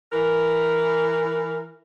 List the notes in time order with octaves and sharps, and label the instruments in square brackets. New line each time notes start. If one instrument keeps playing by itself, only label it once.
[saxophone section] E3 A#4